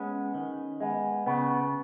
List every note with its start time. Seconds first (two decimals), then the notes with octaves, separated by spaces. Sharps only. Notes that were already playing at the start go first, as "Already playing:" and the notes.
Already playing: G#3 B3 C#4
0.35 D#3
0.80 G#3 B3
1.26 C#3 B3